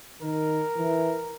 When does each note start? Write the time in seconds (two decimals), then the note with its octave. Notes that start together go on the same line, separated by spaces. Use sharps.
0.22 D#3 A#4
0.77 E3